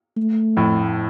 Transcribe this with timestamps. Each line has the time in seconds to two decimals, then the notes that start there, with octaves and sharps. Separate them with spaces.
0.17 A3
0.57 F2 A2